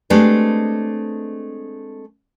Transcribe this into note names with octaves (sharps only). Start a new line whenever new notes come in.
G#3 A3 C4 D4 G4 B4